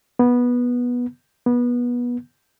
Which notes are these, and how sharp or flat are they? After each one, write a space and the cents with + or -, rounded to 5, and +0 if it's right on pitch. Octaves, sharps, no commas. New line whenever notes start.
B3 -15
B3 -25